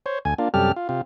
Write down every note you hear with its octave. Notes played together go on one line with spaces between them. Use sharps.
C5 C#5
D2 G#5
A#3 D4 F4
F#2 C3 G3 G4 A4 F6
F4
C3 F4